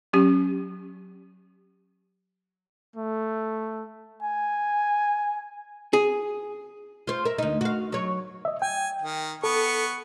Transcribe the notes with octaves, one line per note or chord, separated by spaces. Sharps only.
F#3 C#4 G4
A3
G#5
G#4
F4 C5
A#4 E5
D2 D#4
F#4 F5
F#3 C#5
D#5 E5
G5 G#5
D#3
B3 A4 C#6